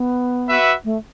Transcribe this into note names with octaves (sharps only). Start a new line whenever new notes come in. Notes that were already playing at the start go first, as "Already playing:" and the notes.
Already playing: B3
F#4 B4 E5
A3